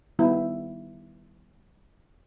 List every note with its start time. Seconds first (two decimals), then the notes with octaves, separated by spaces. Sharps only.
0.19 D#3 G3 B3 E4